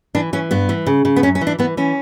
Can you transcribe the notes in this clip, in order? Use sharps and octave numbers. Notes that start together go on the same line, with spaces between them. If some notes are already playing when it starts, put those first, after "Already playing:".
E3 D4
E3 C#4
G2 B3
E3
C#3
C#3
B3
F#2 C#4
C#4
E3
D4
E3 B3
E3 C#4